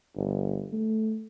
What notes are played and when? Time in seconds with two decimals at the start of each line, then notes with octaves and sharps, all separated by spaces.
0.16 G1
0.73 A3